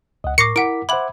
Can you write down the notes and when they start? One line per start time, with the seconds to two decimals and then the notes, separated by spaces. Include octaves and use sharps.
0.24 C#2 D#5 F#5
0.38 A2 A#4 C#6 D6 A#6 C7 C#7
0.56 E4 A#4 F#5 D6 B6 D7
0.89 C5 E5 F#5 B5 D6 G#6 F#7